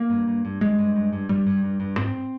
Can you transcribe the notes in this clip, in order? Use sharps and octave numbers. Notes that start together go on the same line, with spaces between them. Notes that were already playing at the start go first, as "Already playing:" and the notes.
Already playing: A#3
G2
G2
G2
G2 G#3
G2
G2
G2
G2 G3
G2
G2
G2
G#2 C4